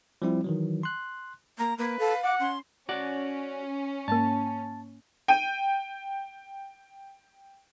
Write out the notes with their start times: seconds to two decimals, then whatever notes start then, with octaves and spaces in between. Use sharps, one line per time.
0.22 F3 G3 C4 E4
0.44 D#3 E3 F#3
0.83 C6 F#6
1.58 A#3 A#5
1.78 A#3 B4
2.00 A4 F5
2.23 F#5 D6
2.40 C#4 C6
2.89 C#4 F#4 D5 F#5
4.08 G#2 A#3 A5
5.28 G5 D#7